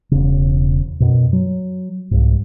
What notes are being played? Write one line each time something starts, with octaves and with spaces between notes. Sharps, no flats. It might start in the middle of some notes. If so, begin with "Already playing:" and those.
E1 C#3
F#2 B2
F#3
C2 G#2